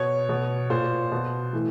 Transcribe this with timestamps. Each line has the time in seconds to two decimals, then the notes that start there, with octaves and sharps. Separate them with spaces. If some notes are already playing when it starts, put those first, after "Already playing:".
Already playing: B2 C#5
0.29 B2
0.70 A#2 C5
1.12 B2
1.53 A2 E3